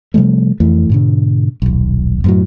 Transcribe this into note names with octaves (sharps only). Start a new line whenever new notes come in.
C3 F3 G3 A3
F2 E3 A3
G#2 B2 D3
D#1 B1
F#2 A2 F#3